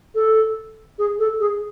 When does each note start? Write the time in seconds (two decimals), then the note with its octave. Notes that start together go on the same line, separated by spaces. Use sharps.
0.15 A4
0.98 G#4
1.19 A4
1.40 G#4